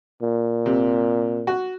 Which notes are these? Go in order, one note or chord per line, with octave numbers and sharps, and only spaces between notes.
A#2
C3
F#4